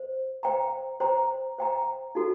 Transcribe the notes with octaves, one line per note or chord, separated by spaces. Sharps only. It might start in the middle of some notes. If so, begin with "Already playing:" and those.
Already playing: C5
C5 G5 A#5
C5 G5 A#5
C5 G5 A#5
D#4 F#4 A4